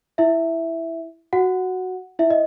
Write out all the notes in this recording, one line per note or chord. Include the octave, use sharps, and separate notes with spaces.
E4 E5
F#4 F#5
E4 E5
D#5